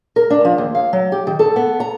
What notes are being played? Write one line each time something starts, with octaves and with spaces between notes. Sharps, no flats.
A#4
D4
F3
D#2
F5
F#3
G4
D#3
A4
B3
A#5